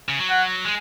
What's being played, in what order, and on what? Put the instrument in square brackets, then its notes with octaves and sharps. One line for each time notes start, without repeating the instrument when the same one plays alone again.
[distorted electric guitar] C#3
F#3
[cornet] F#5
[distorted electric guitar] G#3